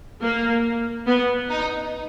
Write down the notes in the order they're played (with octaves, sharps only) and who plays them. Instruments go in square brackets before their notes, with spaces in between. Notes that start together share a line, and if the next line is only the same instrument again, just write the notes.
[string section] A#3
B3
D#4